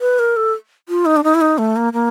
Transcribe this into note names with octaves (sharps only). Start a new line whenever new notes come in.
B4
A#4
A4
F4
D#4
D4
D#4
E4
D#4
A3
A#3
A#3